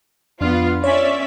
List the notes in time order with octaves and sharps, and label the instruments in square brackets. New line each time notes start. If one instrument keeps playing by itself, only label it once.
[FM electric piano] F2 D4 F6 [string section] B3 F4
[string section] C#4 D5 E5 [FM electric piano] C#5